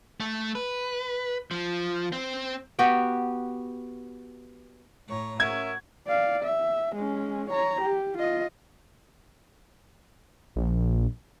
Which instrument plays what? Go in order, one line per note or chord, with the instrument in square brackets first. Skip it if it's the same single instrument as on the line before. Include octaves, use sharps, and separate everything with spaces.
[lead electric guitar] A3
B4
F3
C4
[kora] B3 F#4 G4 G5
[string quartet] A2 C#5 A#5
[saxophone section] C#4 A#4 E5 [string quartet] F#4 [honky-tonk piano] G#6
[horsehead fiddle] D5 F5
E5
G#3 C#4
C#5 A#5
G4
F4 D#5
[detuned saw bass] A#1